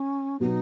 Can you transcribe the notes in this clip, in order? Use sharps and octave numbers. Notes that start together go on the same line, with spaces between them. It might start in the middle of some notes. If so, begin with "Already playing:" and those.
Already playing: C#4
B2 F#3 B3 D#4